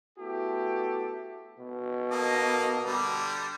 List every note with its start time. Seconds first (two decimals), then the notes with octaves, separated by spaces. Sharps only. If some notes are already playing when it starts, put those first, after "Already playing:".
0.19 A3 B3 E4 F#4 G4 A4
1.59 B2
2.11 A#3 A4 D#5
2.85 D3 G3